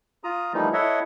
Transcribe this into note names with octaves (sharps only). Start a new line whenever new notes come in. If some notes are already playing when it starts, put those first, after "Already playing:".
F4 A#5 D#6
E3 F3 G3 A3 A#3 D#4
E4 A4 C#5 D#5 E5 F#5